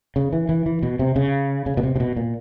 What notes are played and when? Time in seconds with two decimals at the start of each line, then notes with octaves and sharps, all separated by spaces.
0.16 C#3
0.33 E3
0.49 E3
0.66 E3
0.83 B2
0.99 C3
1.16 C#3
1.66 C#3
1.77 B2
1.83 C3
1.96 C3
2.00 B2
2.17 A#2